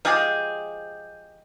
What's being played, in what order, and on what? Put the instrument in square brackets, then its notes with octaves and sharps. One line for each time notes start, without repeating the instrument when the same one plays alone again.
[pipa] F3 G#3 G4 G#4